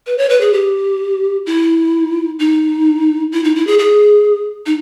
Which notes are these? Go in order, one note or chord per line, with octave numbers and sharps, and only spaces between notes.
B4
C#5
B4
G#4
G4
E4
D#4
E4
D#4
E4
G#4
G#4
D#4